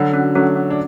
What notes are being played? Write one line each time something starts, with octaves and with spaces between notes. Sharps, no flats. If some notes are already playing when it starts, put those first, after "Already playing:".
Already playing: D3 F#3 F#4
C#4
F#3 A3 C#4
C#4
D4